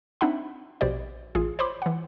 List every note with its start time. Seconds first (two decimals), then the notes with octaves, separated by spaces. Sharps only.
0.21 C4 D4 D#4 E5 F#5 B5
0.81 A#1 B2 G4 C5 D5
1.35 A1 F4 G#4
1.59 C5 C#5 B5 C6 D6
1.82 E3 F#5